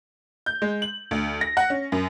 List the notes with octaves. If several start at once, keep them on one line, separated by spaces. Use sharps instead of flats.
G6
G#3
F#7
D2
A#6
F#5
C#4
F#2